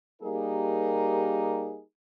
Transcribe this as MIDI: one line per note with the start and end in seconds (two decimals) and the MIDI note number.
0.22 1.81 55
0.22 1.81 58
0.22 1.81 63
0.22 1.81 67
0.22 1.81 68
0.22 1.81 70